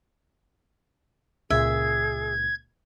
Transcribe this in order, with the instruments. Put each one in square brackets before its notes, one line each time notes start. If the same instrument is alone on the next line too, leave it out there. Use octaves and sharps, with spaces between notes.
[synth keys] C#2 A#2 [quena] G#4 [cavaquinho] E5 [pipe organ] G#6